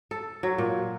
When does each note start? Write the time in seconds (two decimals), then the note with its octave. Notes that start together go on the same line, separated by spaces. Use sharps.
0.11 A4
0.43 F#3
0.58 A#2